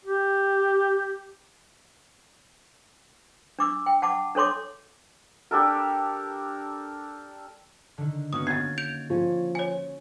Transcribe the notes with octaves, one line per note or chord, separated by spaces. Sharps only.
G4
D4 D6 E6
G5
F#5 A5 D6
D4 A4 C#5 C6 D6
D4 G4 A4 A#4
D3 D#3
A#3 B3 C#4 F#4 D#6
G#6 A6 C7
G6 D7 F7
F3 C#4
C#5 G#5